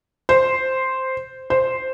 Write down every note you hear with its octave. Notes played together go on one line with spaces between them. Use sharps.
C5
C5